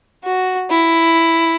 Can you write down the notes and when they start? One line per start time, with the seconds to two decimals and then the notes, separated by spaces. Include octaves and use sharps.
0.24 F#4
0.71 E4